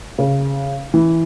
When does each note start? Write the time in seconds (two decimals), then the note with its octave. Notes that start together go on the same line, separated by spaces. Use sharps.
0.18 C#3
0.94 E3